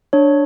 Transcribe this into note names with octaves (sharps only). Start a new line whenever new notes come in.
D4 C#5